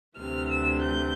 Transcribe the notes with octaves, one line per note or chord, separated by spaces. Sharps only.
D2 C3 E3 F6
E6
G6